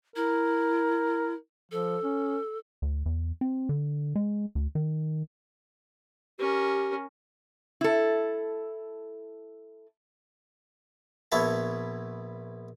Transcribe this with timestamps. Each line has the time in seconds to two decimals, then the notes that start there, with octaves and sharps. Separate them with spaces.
0.16 E4 A#4
1.72 F3 A4
2.03 C#4
2.82 D2
3.06 E2
3.41 C4
3.69 D3
4.16 G#3
4.55 D2
4.75 D#3
6.39 C#4 G4 A#4
7.81 E4 A4
11.32 A#1 B3 E4 C#5 A5